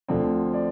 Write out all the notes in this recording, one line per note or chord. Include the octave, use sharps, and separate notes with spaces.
D2 D3 F3 C4
D5